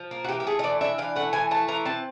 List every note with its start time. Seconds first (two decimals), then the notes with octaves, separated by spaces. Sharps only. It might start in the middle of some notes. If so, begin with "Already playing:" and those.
Already playing: F3
0.11 A#3
0.25 F#4
0.29 E3 G4
0.40 G4
0.47 A3 G#4
0.59 D#5
0.64 E3 D5
0.81 D4 E5
0.98 E3 F5
1.16 A3 F#5
1.33 E3 G#5
1.51 A3 A5
1.68 E3 A#5
1.85 C4 A5